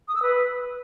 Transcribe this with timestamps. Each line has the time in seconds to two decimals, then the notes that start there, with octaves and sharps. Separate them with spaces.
0.08 D#6
0.15 E6
0.22 B4